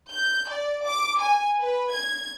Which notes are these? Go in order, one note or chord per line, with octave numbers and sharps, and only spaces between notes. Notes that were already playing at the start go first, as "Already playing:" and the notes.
G6
D5
D6
G#5
B4
G#6